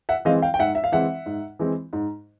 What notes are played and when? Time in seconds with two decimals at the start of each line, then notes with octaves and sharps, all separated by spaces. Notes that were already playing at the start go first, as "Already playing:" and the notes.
0.09 E5 F#5
0.25 E3 G#3 C4 D#5 F5
0.42 F5 G5
0.54 G5
0.59 G#2 E5 F#5
0.75 E5
0.84 F5
0.92 E3 G#3 C4 E5 F#5
1.26 G#2
1.59 E3 G#3 C4
1.93 G#2